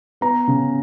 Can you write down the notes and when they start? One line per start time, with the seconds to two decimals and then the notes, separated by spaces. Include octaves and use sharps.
0.21 B3 A#5
0.48 C#3